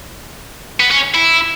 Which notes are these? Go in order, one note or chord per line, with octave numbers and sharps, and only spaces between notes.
B3
C#4
E4